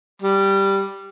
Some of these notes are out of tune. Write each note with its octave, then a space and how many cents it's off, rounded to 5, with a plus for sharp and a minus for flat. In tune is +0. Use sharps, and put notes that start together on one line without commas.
G3 +0